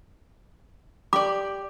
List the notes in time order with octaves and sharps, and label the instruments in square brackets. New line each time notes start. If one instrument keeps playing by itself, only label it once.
[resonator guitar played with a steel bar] G4 D5 [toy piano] D6